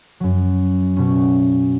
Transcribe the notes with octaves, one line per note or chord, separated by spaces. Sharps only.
F#2 F#3
B2 B3 C#4